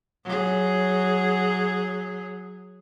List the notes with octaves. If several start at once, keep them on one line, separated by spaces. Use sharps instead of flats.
F#3 G#4